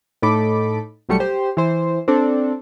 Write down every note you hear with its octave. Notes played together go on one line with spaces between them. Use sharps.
A2 D#4 A4 B5 D6
B1 F#3 G3 A3 C#7
G4 C5 C6
E3 C5
C4 D4 A4